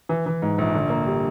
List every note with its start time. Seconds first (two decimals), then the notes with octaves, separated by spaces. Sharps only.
0.09 E3
0.26 E3
0.42 G#2
0.58 A#1
0.74 D3
0.90 A#3
1.06 G3